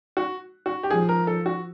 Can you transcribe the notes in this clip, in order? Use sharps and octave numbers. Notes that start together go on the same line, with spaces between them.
F#4
F#4
G4
F3 G#4
A#4
A4
F#4